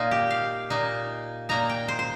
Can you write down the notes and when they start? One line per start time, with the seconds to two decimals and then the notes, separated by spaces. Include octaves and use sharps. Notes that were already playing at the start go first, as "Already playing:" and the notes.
Already playing: A#2 A#3 D#4 F4
0.11 G4
0.31 F5
0.70 A#2 A#3 D#4
1.49 A#2 A#3 D#4 A#5
1.69 G5
1.88 C5
1.99 C5